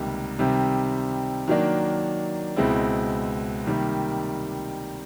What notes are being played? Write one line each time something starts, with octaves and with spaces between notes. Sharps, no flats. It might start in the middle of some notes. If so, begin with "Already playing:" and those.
Already playing: C#2 C3 D#3 G3 A#3
C3 D#3 G3 C4
D#3 F#3 A#3 D4
C#2 B2 G#3 C4 E4
C3 D#3 G3 A#3